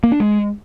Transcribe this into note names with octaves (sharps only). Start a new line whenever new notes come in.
A#3
D4
G#3